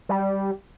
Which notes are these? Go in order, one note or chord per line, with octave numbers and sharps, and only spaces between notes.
G3